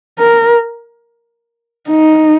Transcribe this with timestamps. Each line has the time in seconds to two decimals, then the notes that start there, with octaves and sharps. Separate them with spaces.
0.19 A#4
1.90 D#4